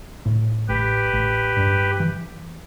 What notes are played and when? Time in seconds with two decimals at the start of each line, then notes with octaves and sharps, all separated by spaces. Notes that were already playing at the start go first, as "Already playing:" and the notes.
0.25 A2
0.68 A1 G4 B4
1.13 A1
1.57 G2
2.00 E3